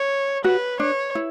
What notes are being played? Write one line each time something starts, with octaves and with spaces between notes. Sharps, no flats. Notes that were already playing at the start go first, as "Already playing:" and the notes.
Already playing: C#5
F#4 B4
D4 C#5
E4